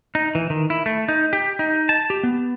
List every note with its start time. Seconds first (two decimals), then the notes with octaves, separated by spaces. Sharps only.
0.15 D#4
0.35 E3
0.50 D#3
0.70 E4
0.86 A3
1.08 D#4
1.33 G4
1.59 D#4
1.89 A5
2.10 G4
2.23 B3